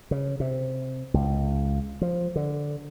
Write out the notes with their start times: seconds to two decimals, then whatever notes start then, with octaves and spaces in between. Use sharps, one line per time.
0.11 C#3
0.40 C3
1.14 C#2
2.01 F3
2.36 D3